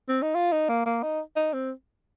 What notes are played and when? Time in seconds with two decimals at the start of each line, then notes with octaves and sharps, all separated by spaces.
0.09 C4
0.22 D#4
0.35 F4
0.52 D#4
0.69 A#3
0.86 A#3
1.03 D#4
1.36 D#4
1.53 C4